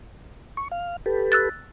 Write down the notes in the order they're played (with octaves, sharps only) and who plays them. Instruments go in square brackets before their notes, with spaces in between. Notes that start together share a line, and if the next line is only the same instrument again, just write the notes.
[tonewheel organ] C#6
F5
G4 A4 B4
[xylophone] E6 F#6 A6